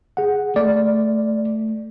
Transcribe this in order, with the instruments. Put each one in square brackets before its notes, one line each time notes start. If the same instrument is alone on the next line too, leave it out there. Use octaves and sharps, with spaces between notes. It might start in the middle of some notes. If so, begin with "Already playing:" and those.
[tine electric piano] G#4 F#5
[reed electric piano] A3 [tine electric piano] D5